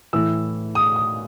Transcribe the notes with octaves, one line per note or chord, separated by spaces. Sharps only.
A2 E3 E6
D#6
D#6